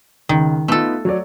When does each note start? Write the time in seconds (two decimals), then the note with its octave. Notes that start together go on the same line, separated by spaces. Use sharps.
0.29 C#2 D#3
0.68 A3 B3 D#4 F4 A4
1.05 F#3 C#5 D5